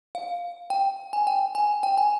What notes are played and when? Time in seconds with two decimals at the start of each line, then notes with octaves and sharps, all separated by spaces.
0.15 F5
0.70 G5
1.13 G#5
1.27 G5
1.55 G#5
1.83 G5
1.98 G#5